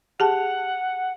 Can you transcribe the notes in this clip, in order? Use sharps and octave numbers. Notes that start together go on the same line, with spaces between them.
G4 G#4 F#5 A5